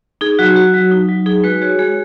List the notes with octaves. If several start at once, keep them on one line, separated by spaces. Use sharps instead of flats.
D#4 G#4
F#3 F#4
F#4
F#3
D#4
F#3
D#4 G#4
G#3 F#4 B4
F#4 G#4 C#5
G#3 G#4